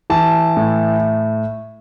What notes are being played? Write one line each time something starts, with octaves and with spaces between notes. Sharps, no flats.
E3 A5
A2